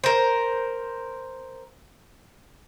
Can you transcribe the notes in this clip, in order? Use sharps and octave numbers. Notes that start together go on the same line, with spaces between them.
A#4 C5